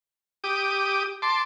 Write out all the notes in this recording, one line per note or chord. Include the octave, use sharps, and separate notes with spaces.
G4 D6 D#6
A5 C6 D6